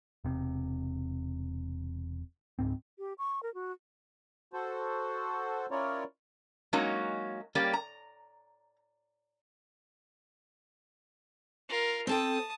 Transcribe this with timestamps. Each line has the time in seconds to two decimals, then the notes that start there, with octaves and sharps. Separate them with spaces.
0.25 E1 C3
2.59 C#2 G#2 C4
2.99 G4
3.18 C#6
3.43 A#4
3.54 F#4
4.53 F#4 A4 C5
5.71 C#4 E4 F4 A#4 C#5 D5
6.73 F#3 G#3 A#3 C#4 D#4 F#4
7.55 G3 A#3 C#4 G4 D5
7.73 A#5
11.69 F4 A#4
12.07 C4 A4 G5 A5 D#6